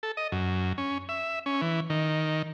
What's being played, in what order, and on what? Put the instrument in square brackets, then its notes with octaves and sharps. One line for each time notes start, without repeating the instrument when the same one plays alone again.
[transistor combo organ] A4
D#5
F#2
C#4
E5
C#4
E3
D#3